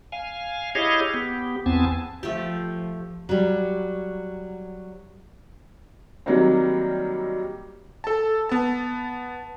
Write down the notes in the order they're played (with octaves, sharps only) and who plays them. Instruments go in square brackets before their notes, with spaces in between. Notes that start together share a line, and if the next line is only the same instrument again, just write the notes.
[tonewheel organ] F5 G#5
E4 G4 G#4 C#5 D#5 F5
B3 G4
E2 B3 C4 G#5 A5
[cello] F3 [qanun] A3 G4
[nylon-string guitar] F#3 G3
[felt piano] D#3 F#3 G3 A#3 C4
[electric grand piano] A4 A5
B3 A5